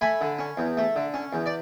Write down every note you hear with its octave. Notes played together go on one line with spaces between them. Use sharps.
A3 G#5 B5
D3
C#4
E2
A3
D3
C#4
E2
D5